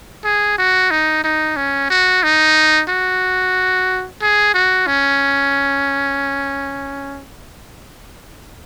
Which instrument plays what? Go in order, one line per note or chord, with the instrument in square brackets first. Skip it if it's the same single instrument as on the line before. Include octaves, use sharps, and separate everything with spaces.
[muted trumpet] G#4
F#4
D#4
D#4
C#4
F#4
D#4
F#4
G#4
F#4
C#4